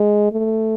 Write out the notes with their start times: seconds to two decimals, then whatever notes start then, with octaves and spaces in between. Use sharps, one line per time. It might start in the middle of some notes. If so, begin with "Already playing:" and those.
Already playing: G#3
0.32 A3